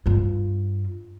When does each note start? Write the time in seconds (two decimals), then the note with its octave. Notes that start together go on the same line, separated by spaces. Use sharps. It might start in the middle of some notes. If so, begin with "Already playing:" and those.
0.06 G2 F4